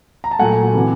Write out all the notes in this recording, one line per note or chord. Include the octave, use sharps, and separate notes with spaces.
A#5
A5
A#2 F#3 A3 F#5 G#5
C3 E3